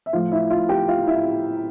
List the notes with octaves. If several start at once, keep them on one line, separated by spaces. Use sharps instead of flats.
E5
A2 F3 A3 F4 F5
E4 E5
F4 F5
G4 G5
F4 F5
E4 E5